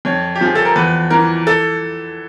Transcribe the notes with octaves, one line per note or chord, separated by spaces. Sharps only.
F2 C#5
G4
F3 G#4
A4
A#4
E2 B4
E3 A#4
A4